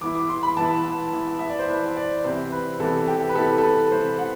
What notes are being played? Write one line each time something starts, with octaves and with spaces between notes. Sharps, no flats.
E3 B3 E4 D6
D6
C6
B5
E3 B3 E4 A5
E3 B3 E4
E5
D5
C5
E3 B3 E4 B4
D5
C3 E3 B3 E4 C5
B4
C3 E3 B3 E4 A4
G4
B4
C3 E3 B3 E4 A4
A4
B4
C3 E3 B3 E4 C5
F#5